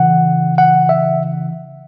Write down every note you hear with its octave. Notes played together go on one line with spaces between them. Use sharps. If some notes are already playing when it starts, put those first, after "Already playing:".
Already playing: C#3 E3 F#5
F#5
E5